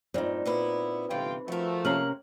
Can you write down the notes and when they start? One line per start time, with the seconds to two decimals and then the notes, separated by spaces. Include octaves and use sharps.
0.14 G2 A#2 C4 D#4
0.46 A#2 B3 E4 B4 B5
1.10 G1 C3 E3 F4 G5
1.48 F3 A3 F#4 A#4
1.85 C3 A#3 C#4 A#4 F6 F#7